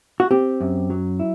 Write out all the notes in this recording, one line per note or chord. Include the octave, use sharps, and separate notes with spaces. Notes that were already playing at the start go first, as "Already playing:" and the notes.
F#4
C4 G4
F#2
F#3
E4